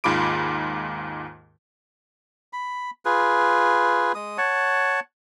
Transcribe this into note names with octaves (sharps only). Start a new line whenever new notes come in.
D#2 G#2 F4 B5 D6 D7
B5
F4 G#4 B4
G#3 D#6
C#5 F#5 A5